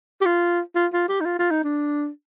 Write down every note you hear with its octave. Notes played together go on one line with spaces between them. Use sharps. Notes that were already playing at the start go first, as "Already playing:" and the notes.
G4
F4
F4
F4
G4
D#4
F4
F4
D#4
D4